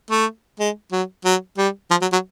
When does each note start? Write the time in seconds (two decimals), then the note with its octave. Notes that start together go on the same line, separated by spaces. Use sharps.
0.11 A3
0.59 G#3
0.92 F#3
1.25 F#3
1.58 G3
1.91 F3
2.02 F#3
2.12 F#3